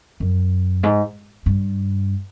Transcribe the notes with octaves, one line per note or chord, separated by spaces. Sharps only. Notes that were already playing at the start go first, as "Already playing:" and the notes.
F#2
G#2
G2